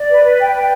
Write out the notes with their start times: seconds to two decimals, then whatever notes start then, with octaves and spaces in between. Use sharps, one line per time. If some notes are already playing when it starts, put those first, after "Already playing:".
Already playing: D5
0.09 B4
0.23 B4
0.39 G5
0.54 G5